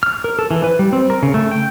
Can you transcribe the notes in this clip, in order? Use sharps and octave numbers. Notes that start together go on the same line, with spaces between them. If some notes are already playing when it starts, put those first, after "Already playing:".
F6
A#4
A4
E3
B4
G3
C4
A#4
C#3
A3
G5